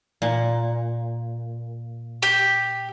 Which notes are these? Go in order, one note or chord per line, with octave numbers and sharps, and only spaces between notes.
A#2
G4